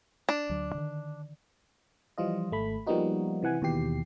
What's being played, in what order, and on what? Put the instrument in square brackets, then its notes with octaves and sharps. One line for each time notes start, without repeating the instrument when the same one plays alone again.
[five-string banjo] D4
[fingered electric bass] D2 F#3
D3 D#3
[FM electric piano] E3 F3 G3 F4 D#5
G#1 A3 B5
F3 G3 A#3 B3 D#4 F#4
C3 E3 F#5 G#5
D#2 B2 E3 G4 C7